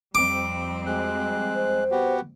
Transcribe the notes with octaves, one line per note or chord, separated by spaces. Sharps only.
F2 G3 C4 D6
G#3 F#4 F#6
C5
B3 F#4 G4